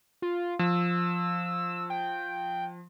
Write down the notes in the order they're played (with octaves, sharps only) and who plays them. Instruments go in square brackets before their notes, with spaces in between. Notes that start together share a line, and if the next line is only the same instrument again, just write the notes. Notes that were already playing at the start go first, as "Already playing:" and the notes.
[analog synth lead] F4
[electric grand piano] F3 [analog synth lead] E6
[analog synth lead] G5